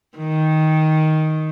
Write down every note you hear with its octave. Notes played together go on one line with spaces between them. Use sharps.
D#3